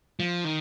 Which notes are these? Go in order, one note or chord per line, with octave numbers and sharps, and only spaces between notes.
F3
D#3